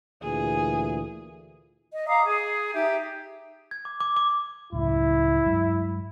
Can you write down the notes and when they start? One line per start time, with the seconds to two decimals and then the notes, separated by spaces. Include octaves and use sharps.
0.23 D2 A#2 E3 G#4
1.92 D#5
2.07 F5 A#5 D6 D#6
2.24 G#4
2.74 D#4 G4 E5
3.71 G#6
3.85 D6
4.00 D6
4.17 D6
4.73 C#2 F#2 A2 E4
5.46 G2 F#3 G#3